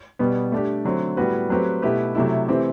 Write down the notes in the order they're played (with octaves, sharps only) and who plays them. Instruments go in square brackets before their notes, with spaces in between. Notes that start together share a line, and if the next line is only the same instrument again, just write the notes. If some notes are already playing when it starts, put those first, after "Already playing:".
[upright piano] B2 G3 B3
A3 D4 G4
D3 F#3 A3 C4
A2 G3 B3 F#4 B4
F#3 A3 C4 G4 B4
B2 A3 E4 G4 B4
C3 F#3 A3 E4
C3 E3 A3 C4 G4